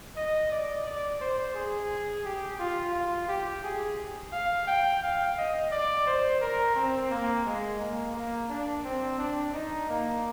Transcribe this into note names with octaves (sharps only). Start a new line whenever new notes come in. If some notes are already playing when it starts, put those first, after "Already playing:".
D#5
D5
D5
C5
G#4
G4
F4
F4
G4
G#4
F5
G5
F5
D#5
D5
C5
A#4
C4
A#3
G#3
A#3
A#3
D4
C4
D4
D#4
A#3